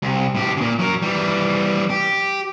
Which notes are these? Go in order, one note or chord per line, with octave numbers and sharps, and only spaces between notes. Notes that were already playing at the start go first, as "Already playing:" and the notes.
C2
A2 G4
A#2 C#3
F#3 A#4
E3 G3
G4